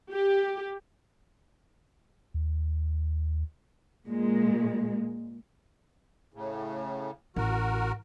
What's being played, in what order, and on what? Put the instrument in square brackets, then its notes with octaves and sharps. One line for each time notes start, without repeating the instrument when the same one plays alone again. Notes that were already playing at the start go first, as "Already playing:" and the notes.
[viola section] G4
[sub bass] D#2
[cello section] A#2 G#3
[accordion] A2 C#3
[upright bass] A1 [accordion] F#4 A#4